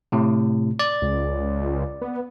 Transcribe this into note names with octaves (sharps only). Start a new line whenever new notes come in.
A2 C3
D5
C#2
B3